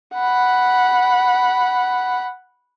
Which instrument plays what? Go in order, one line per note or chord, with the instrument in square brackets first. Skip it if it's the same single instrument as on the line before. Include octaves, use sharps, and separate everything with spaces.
[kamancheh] F#5 B5